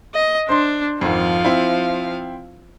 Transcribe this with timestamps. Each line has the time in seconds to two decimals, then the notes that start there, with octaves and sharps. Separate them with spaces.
0.14 D#5
0.49 D4 C5 C6
1.01 G#1 F2 F3 F5
1.45 C4 E4